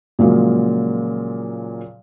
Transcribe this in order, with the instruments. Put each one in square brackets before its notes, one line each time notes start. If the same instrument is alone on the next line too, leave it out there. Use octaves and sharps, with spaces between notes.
[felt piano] A#2 C#3 F3 F#3 G#3 A#3